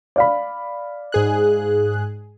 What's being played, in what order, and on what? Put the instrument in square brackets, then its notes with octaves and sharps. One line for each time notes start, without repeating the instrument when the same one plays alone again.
[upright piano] D5 F5 B5
[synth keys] G#2 G#4 F#6